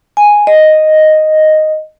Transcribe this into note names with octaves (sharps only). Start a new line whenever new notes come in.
G#5
D#5